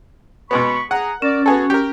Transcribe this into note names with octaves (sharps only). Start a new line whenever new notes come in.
B2 G#3 B3 B5 C#6
G#4 F#5 G#5 A#5
C#4 A#4 D5
B3 F#4 G#4 A4
G4 A#4